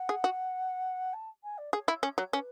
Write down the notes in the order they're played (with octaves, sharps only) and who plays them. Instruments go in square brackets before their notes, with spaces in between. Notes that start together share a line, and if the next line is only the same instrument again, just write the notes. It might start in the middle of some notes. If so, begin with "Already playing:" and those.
Already playing: [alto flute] F#5
[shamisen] G#4
F#4
[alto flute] A5
G#5
D5
[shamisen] G#4 [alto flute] C#5
[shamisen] E4
C#4
F#3
[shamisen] C#4 [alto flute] B4